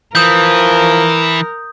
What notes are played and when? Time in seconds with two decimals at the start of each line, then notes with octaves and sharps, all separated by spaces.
0.15 E3 F3 A#4 D#6 G6